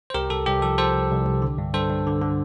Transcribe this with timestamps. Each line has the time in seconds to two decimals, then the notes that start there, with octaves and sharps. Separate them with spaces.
0.10 C5
0.14 C2 G4 A#4
0.30 C2 A4
0.46 C2 G4
0.62 F3 A4
0.78 F3 A4 C5
0.94 C2
1.11 C2
1.26 C2
1.42 D3
1.58 G2
1.74 G2 A4 C5
1.90 G2
2.06 D3
2.22 D3